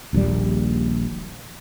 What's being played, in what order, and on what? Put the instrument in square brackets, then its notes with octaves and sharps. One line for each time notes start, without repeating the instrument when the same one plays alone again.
[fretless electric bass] D#1 A#1 D#2 G3